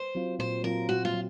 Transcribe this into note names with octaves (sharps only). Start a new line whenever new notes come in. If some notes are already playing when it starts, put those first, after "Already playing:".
Already playing: C5
F#3 C4 F4
A#2 C5
F#3 C4 F4 A#4
A#2 F#4
F4
F#3